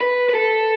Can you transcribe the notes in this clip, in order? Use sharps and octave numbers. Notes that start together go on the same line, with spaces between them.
B4
B4
A4